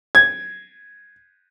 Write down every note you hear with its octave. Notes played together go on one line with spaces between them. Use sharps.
G#6